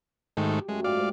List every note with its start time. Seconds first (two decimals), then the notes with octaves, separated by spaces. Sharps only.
0.37 G#2 D#3 A3 G4
0.69 F#2 G#3 A3
0.84 G#2 F4 G4 D5 F5
0.98 A2 C5